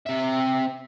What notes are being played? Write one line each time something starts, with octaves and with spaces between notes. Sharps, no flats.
C3 E5